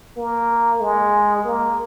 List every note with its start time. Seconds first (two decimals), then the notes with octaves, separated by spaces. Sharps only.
0.17 A#3
0.81 G#3
1.44 A#3